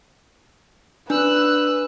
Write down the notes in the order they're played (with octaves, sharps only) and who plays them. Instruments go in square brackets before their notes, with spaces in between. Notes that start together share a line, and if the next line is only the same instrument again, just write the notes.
[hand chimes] D4 [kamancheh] B4 [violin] E6 F#6